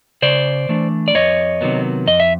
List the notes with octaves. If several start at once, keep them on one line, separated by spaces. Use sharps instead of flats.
C#3 C5 D5
E3 A3 D4
D5
F2 C#5 D#5
C3 D#3 F#3 B3
F2 D#5
E5